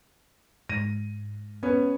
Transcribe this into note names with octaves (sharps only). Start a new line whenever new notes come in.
G#2 A#6 D#7
B3 C#4